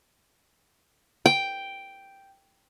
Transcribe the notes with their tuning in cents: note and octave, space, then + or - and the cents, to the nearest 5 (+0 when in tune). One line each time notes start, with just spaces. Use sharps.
G5 +0